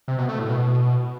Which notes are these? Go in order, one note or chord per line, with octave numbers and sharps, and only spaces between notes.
C3
B2
A3
A2
B2